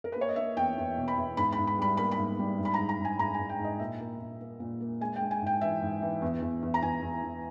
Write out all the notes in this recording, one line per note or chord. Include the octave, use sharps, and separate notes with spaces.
A#4
B4
A#3
C#5
D#5
A#3 E5
E2 G5
E2
B2
B5
E2
G#2 B5
B5
G#2
B5
G3 B5
A#3 B5
B5
G#2
G3
G#2
B5
G#2 A#5
A#5
G#2
G#5
G#2 A#5
G#5
G#2
G5
G#2
D#5
A#2 E5
A#3
A#2
A#3
A#2
A#3
G#3 G#5
G5
G#3
G#5
G#2 G5
E3 E5
G#2
E3
E2
E2
E2
A#5
E2 G#5
E2
E2